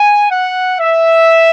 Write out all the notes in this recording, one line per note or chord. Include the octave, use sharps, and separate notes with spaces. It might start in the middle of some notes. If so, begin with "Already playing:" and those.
Already playing: G#5
F#5
E5